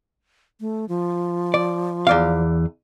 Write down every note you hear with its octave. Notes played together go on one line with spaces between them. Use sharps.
A3
F3
D5
E2 D5 F5